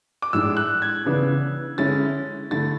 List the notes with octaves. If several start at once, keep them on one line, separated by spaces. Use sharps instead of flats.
D6
A2 G#3 D4 E6
F#6
G#6
C#3 E3 B3 D4
D3 G#3 C#4 E4 A6
D3 A3 E4 A6